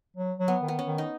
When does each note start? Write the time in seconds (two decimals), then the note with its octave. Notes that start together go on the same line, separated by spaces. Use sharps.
0.17 F#3
0.39 F#3
0.48 B3
0.62 D#3
0.68 B3
0.79 C#4
0.86 D#3
0.98 D#4